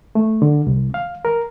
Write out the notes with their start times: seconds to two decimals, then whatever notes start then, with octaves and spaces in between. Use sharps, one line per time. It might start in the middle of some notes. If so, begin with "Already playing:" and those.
0.15 A3
0.42 D3
0.67 C2
0.94 F5
1.25 A#4